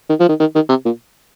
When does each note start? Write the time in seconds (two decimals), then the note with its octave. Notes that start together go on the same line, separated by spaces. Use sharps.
0.09 D#3
0.19 F3
0.29 D#3
0.40 D#3
0.55 D#3
0.69 C3
0.85 A#2